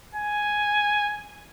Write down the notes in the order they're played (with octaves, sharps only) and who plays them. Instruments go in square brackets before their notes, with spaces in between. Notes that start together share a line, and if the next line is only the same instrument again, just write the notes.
[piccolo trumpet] G#5